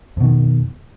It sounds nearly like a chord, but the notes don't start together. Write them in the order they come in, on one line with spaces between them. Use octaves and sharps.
F2 B2 D#3